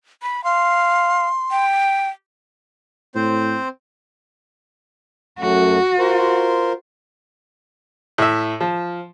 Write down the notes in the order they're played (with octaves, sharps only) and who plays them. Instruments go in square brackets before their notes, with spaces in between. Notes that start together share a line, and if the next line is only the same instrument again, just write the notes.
[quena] B5
[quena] F5 [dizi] C6
[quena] G5
[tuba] A2 [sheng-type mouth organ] C4 C5
[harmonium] F#2 F#3 A3 [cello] F#4
[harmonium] F4 A#4 C5
[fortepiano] A2 E5
F3